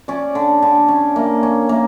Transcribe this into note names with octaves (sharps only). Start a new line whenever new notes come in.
C#4 D5
D3
D3
C#4
A#3
C#4
A#3